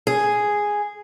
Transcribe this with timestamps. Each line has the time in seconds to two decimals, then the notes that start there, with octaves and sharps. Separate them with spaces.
0.07 G#4